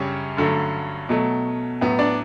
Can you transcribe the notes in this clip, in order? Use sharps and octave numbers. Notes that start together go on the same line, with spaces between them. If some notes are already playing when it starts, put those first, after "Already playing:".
Already playing: F#2 C#3 G3 C#4 D4 C#5
G2 D3 F#3 A3
B2 F#3 A3
A2 F#3 B3
D4 D5